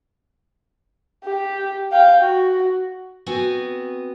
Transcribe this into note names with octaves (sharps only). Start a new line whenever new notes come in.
G4
F5 G5
F#4
B3 C4 F#4 G#5